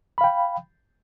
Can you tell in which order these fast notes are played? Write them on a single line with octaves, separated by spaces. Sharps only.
B5 F5 G5